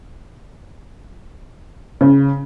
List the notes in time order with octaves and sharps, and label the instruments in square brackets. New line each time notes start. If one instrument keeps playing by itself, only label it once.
[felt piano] C#3